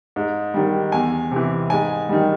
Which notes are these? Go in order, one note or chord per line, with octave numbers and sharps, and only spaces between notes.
G#2
D#3 G3
E2 G#5
C3 E3
G#2 G#5
D#3 G3